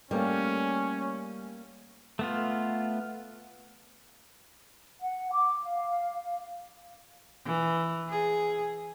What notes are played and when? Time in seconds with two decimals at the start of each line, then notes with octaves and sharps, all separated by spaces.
0.11 G3 A3 A#3 C#4 F5
2.19 A3 B3 F4
5.02 F#5
5.32 D6
5.62 F5
7.45 E3
8.10 G#4